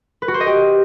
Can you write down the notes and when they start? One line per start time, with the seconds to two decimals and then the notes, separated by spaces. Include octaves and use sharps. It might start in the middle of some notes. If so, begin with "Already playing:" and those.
0.22 B4
0.28 F#4
0.34 C5
0.40 D#5
0.46 G4